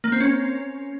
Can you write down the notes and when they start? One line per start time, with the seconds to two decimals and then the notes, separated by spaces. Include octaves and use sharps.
0.04 A#3
0.12 C4
0.20 C#4